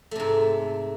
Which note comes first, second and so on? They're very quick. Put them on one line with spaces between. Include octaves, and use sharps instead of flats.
A3 C3 G#2